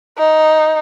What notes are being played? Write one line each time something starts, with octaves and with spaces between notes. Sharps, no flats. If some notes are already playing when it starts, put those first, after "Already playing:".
D#4